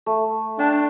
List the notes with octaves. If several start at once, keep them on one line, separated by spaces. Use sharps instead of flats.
A3
D4 G5